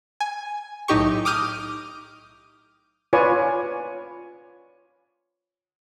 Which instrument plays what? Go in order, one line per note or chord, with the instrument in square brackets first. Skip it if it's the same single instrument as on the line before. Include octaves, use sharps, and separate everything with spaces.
[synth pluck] G#5
B1 A2 D#4 G4 C#6
D6 D#6 F6 G6 D#7
[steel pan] F4 B4 C#5 D5 G#5 C#6